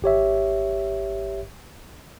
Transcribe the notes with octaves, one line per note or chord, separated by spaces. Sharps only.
G#1 G4 C#5 E5